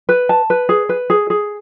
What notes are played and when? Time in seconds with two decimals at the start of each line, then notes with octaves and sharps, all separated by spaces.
0.09 B4
0.29 A5
0.50 B4
0.69 G#4
0.89 B4
1.10 G#4
1.30 G#4